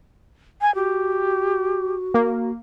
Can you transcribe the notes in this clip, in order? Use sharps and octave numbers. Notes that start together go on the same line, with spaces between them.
G#5
F#4 G4
A#3